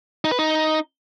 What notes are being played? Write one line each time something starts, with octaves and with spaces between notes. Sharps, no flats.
D#4
B4
D#4